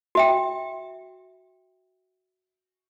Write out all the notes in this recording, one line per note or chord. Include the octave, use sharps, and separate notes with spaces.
F#4 E5 G5